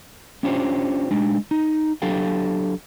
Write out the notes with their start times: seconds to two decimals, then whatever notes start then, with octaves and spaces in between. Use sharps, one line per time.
0.43 C#4 D4 F4 G4 C5 C#5
1.11 G#3 D4 D#4
1.51 D#4
2.02 F#3 D4 G4 A4 F5 G5